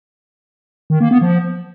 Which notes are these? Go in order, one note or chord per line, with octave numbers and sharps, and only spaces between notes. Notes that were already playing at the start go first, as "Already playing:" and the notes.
D#3
A#3
B3
F3